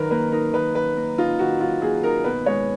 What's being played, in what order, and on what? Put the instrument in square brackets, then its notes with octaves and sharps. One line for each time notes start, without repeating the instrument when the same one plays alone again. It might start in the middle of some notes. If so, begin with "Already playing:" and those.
Already playing: [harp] D#3 F#3 D#4 [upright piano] A#4 B4
[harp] A#3 [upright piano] B4
[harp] D#4 [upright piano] A#4
[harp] D#3 [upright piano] B4
[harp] F#3 [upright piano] B4
[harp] A#3
[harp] D#4 [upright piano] F4
[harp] D#3 [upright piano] F#4
[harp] F#3 [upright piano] F4
[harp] A#3 [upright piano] G#4
[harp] D#4 [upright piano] A#4
[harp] B2 [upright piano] B4
[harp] G#3 [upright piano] C#5